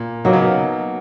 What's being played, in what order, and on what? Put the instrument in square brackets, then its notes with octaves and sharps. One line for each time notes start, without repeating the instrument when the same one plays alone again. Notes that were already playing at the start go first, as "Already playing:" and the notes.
Already playing: [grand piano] A#2
[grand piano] B2 [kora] F#3 A#3 D#4
[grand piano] C#3
B2